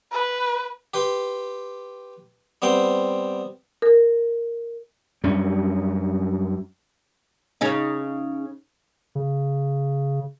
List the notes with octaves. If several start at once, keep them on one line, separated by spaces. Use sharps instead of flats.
B4
G4 B4 C6
G3 B3 C4 G5 C6
A#4
F#2 G3 C#4 D4
C#3 C#4 D#4
C#3